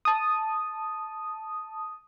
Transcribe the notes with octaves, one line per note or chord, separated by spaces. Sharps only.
A5 D#6